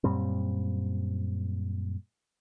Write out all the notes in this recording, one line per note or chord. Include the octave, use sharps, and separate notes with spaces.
F#2 A#2 G3 C4